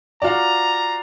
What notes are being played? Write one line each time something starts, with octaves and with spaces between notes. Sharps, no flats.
F4 F#4 D5 A#5